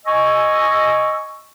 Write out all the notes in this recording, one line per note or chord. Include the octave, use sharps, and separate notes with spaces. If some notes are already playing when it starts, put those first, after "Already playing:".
D#5 G#5 C#6 E6